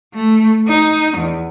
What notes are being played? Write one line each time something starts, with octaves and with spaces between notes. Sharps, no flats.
A3
D#4
E2